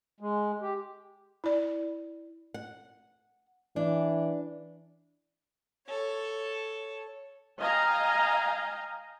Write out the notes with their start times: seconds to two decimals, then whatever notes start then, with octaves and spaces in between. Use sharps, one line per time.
0.20 G#3
0.62 G4
1.44 E4 D5
2.54 F#5
3.76 E3 D4
5.86 A4 C#5
7.61 D#5 F5 G5 G#5 A#5